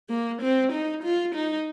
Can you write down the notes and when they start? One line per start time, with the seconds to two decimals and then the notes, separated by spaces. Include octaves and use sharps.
0.09 A#3
0.42 C4
0.72 D#4
1.03 F4
1.35 D#4